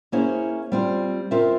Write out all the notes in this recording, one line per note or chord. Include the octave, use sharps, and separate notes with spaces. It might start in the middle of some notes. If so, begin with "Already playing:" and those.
A#3 C#4 E4 G#4 C5
G3 C4 F4
C4 F4 A#4 E5